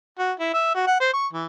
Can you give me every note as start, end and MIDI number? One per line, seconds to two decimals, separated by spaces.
0.19 0.32 66
0.40 0.51 64
0.54 0.72 76
0.75 0.86 66
0.87 0.96 78
1.00 1.09 72
1.13 1.27 85
1.33 1.46 52